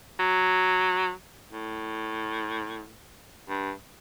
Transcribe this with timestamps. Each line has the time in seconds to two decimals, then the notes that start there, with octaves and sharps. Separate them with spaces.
0.19 F#3
1.51 A2
3.49 G2